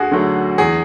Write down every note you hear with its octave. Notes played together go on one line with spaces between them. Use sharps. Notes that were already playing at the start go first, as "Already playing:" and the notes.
Already playing: D2 F#4 G#4
D3 F#3 A3
E2 G#4